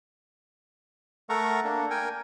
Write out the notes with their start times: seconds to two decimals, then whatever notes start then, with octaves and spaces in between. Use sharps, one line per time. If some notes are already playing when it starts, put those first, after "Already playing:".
1.29 A3 A4 A#4 F#5 A#5 C#6
1.64 A#3 D4
1.91 A#4 G5 G#5